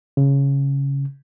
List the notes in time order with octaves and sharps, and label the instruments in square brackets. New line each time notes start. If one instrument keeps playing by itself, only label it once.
[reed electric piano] C#3